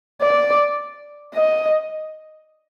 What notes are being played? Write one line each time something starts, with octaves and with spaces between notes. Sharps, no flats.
D5
D#5